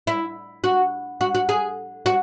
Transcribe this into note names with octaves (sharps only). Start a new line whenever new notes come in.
E4
F#4
F#4
F#4
G#4
F#4